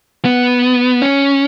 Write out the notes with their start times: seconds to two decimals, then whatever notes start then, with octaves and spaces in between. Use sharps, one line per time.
0.25 B3
1.02 C#4